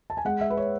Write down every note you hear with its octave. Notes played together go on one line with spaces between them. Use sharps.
A5
G#5
G#3 F#5
E5
B4
C#5